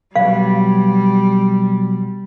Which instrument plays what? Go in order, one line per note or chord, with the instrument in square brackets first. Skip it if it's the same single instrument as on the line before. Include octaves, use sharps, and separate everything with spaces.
[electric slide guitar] B2 F#3 B4 [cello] G3 [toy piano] F5